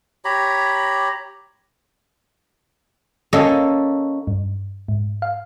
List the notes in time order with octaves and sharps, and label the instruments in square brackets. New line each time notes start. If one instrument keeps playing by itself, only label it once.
[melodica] G4 C#5 A#5 B5
[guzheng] A#3 C#4 A4 D#5
[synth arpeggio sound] G2
G#2
F5